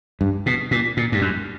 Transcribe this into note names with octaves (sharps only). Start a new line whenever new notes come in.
G2
B2
A#2
A#2
G2
F#2